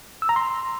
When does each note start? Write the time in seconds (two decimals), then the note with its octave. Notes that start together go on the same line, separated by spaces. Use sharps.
0.22 E6
0.29 A#5
0.36 C6